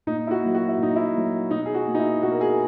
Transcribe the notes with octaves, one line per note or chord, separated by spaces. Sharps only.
A#2 D#4
E4
F#4
F#3 A#3
F#4
E4
A#2 D#4
E4
F#3 A#3
B2 D#4
G#4
F#4
A#3
D#4
E4
B2 F#4
A#4
G#4